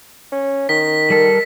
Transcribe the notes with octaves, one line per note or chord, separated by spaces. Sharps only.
C#4
D#3 B6
G3 A4 A#4